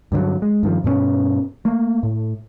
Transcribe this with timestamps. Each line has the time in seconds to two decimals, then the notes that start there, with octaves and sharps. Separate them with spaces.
0.12 G2 D3 D#3 F#3
0.42 G#3
0.63 G2 D#3 F3
0.84 G2 B2 A3 C#4
1.65 A3 A#3
2.03 A2